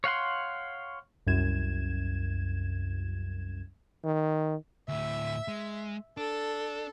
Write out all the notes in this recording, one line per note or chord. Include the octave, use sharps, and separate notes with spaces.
C#5 F5 F#5 C6
C2 F#2 G#6 E7
D#3
D2 A2 E5
G#3
D4 A4